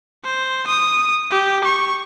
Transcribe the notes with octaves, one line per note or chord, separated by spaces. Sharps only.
C5
D#6
G4
C#6